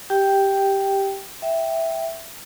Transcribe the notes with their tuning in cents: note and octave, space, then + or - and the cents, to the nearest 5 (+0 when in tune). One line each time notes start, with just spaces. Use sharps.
G4 +0 G5 +0
E5 +0 G5 +0